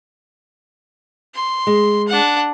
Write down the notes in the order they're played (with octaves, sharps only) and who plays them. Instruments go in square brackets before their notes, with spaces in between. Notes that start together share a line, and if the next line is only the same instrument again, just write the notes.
[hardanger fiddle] C6
[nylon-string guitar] G#3
[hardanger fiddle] D4 F#5